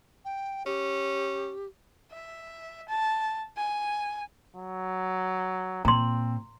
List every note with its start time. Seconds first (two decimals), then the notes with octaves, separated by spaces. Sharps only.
0.25 G5
0.66 C#4 G4
2.13 E5
2.89 A5
3.57 G#5
4.56 F#3
5.85 A#2 C4 A#5 C6